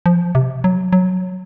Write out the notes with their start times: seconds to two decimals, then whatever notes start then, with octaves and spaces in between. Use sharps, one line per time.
0.06 F3
0.35 C3
0.64 F#3
0.93 F#3